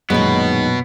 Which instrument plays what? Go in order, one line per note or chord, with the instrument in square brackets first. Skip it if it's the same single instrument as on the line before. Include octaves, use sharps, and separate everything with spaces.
[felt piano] A#1 F#2 [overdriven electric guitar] B2 B3 [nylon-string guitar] D#3 G#3